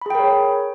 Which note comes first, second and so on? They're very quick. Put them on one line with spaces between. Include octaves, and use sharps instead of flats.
B5 G#4 G5 A#4 C#5